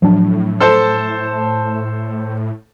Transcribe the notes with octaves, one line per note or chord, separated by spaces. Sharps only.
A2 F3 F#3 D4
A4 C5 A5